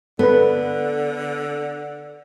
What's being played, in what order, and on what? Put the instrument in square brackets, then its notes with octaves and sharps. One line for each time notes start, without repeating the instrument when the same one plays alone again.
[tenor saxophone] D3 [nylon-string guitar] B3 [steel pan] A4 B4